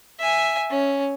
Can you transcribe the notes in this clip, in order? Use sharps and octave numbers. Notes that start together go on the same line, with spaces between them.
E5 G#5
C#4